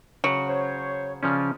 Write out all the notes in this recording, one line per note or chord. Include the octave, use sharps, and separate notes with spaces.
C#3 F#3 F#5
C5 C#5
C#3 F3 C#4 D5 F6